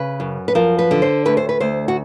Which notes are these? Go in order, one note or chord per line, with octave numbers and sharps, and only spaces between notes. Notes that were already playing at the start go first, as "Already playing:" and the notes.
Already playing: C#3 B4
F#2
B4
F3 A#4
B4
D3
C5
D2 B4
C5
B4
D2 C5
F#4